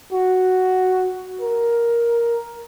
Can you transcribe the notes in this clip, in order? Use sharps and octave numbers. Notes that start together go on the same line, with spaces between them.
F#4
A#4